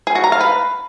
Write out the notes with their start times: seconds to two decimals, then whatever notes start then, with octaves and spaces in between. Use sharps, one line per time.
0.07 G#4
0.15 F#4
0.24 A#5
0.32 F5
0.41 B4